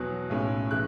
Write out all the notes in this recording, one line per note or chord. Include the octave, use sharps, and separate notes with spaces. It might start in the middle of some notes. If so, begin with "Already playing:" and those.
Already playing: E2 B2 F#3 F#6
B1 A2 G#3 C#4
C#3 E3 G#3 F#6